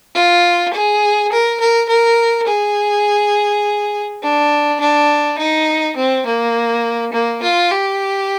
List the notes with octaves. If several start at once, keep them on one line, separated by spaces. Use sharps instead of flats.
F4
G#4
A#4
A#4
A#4
G#4
D4
D4
D#4
C4
A#3
A#3
F4
G4